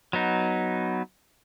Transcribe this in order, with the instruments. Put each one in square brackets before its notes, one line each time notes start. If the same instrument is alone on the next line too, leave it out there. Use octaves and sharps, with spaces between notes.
[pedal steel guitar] F#3 B3 D#4